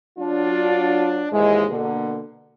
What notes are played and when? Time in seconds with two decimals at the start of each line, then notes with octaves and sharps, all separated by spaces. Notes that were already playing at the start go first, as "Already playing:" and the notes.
0.19 F#3 D4 F4
1.32 D#2 G#2 E3 G#3
1.69 B2 D3 A#3